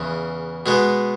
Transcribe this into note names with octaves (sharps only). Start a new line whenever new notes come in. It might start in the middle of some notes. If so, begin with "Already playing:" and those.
Already playing: E2 C#3 E3
B2 G#3 B3